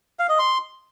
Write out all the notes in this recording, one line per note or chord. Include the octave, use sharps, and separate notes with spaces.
F5
D#5
C6